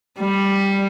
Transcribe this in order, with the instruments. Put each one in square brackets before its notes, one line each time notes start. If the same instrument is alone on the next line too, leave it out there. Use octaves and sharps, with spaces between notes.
[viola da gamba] G3